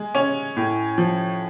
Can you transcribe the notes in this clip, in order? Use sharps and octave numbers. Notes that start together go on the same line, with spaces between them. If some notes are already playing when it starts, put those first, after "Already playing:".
Already playing: G#3
C#4
A2
F3